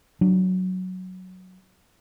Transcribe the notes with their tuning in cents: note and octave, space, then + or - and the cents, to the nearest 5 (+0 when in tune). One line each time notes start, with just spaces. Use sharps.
F#3 +0 D4 +10